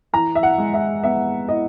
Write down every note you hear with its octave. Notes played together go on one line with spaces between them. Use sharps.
E3 A#5
E5
F#5
G#3
E5
B3 E5
E4 D#5